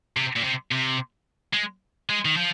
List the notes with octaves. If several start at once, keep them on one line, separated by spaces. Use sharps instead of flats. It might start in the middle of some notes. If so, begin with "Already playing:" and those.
C3
A#2
C3
C3
G#3
G#3
D#3
F3